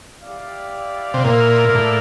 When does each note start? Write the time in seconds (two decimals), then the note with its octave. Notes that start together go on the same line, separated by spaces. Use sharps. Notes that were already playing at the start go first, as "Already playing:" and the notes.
0.22 E4 G4 D5 F5
1.14 C3
1.24 A#2 A#3 E4 A#4 D5
1.69 A#2
1.75 A2